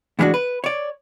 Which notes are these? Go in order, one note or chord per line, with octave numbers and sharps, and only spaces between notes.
A2 E3 G3 G#3 D4 F#4
B4
C#5 D5